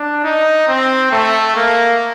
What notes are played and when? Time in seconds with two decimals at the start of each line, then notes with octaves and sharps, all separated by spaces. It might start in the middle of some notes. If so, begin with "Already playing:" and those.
Already playing: D4
0.24 D#4
0.68 C4
1.12 A3
1.56 A#3